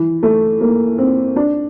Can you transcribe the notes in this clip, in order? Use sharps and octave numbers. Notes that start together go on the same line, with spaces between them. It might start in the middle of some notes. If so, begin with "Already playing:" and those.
Already playing: E3
A3
A#3
C4
D4